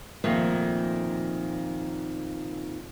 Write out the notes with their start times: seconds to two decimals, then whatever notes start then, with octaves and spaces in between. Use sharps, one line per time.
0.24 F2 A#2 D#3 A3